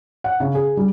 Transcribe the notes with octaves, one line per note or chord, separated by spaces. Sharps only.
F#5
C#3
G#4
G3